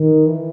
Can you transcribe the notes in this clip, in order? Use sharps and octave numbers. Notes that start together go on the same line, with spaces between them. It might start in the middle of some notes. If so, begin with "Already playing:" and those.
Already playing: D#3
E3